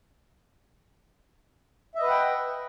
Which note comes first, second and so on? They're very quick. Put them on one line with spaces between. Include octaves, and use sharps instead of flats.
E5 D#5 B4 F#5 G5